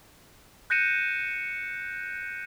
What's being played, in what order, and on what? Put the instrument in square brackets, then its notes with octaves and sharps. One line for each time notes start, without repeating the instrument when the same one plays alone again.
[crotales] F#6 G6 A#6 C#7 D#7 E7